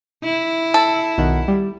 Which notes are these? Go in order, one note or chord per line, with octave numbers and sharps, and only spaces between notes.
E4
A4
B1 D#3 F#5
G3